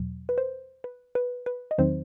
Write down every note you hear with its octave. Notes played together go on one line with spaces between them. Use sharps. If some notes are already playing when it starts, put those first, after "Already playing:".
Already playing: E2 B2 F#3
B4
C5
B4
B4
B4
D#5
E2 D#3 F#3 C4 D#4 C5